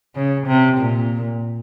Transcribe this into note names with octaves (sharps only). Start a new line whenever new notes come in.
C#3
C3
A#2